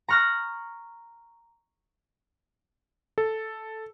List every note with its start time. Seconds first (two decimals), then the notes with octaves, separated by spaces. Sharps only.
0.08 A#5 C#6 F6 F#6 A#6
3.18 A4